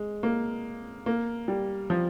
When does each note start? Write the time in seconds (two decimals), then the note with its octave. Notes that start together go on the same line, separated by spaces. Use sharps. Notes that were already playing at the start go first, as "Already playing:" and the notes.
Already playing: G#3
0.23 A#3
1.06 A#3
1.48 G3
1.90 F3